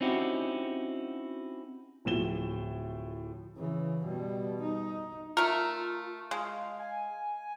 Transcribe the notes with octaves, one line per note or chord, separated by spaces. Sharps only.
C4 C#4 D#4 E4 F#4 G4
D1 A2 F3 E7 G7
C#3 E3
B2 G3
D#4
A3 F4 A#4
G#3 F5
G#5